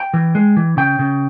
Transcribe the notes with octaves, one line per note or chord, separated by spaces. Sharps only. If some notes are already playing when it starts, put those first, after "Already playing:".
Already playing: G5
E3
G#3
E3
C#3 G5
C#3